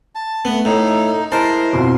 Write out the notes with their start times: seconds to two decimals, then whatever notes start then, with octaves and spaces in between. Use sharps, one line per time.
0.15 A5
0.45 A3 B3
0.65 A2 D#4 A4
1.32 G#3 E4 A#4 C5 A5
1.73 F2 B2 C6